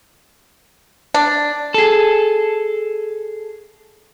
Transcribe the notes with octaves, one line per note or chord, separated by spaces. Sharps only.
D4
G#4 A4